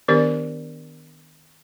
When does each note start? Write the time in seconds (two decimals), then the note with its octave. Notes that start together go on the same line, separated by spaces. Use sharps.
0.08 D#3 B3 D4 G4 A#4 D5